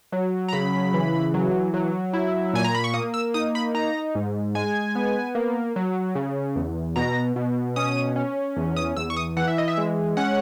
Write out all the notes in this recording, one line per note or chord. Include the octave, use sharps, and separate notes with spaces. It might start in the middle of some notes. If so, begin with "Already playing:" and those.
F#3
A#5
C#3 B5
E3
F#3
F#3
E4
A#2 G#5
A#5
B5
C#6
A#3 D#6
E6
D#4 D#6
B5
D#4 A#5
G#2
G#3 G#5
B3
A#3
F#3
C#3
E2
B2 A#5
B2
C#4 D#6
C#4
E2
D#6
E2 E6
C#6
D#6
E3 F#5
E5
D#5
E5
G#3
C#4 F#5